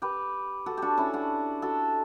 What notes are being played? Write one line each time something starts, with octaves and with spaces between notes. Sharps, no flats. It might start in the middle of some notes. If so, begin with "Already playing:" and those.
G4 B4
F#4 A4
D4 F#4 G4
C#4 E4
D4 F#4
F#4 A4